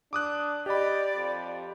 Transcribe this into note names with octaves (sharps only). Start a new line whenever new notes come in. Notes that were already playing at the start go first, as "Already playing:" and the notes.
D4 D6 D#6 F#6
G4 D5 D#5 B5
F2